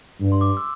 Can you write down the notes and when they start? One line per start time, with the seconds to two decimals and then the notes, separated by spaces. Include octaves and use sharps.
0.20 G2
0.32 C6
0.41 D6
0.57 E6